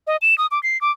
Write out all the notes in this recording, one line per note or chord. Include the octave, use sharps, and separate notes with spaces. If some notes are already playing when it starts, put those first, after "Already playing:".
D#5
E7
D#6
D6
C7
D6